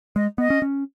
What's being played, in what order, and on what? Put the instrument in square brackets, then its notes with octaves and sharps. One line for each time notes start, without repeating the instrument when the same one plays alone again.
[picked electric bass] G#3 [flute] D#5
[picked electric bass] B3 [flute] D#5
[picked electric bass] C#4
C#4